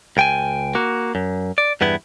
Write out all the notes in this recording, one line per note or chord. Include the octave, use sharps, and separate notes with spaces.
C#2 G5 G#5
A#3 F#4
F#2
D5
E2 G2 B3 E4